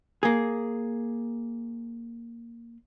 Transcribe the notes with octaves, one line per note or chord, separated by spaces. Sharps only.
A#3 G#4